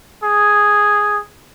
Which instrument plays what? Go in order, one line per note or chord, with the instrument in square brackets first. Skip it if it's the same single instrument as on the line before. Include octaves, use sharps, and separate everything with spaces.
[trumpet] G#4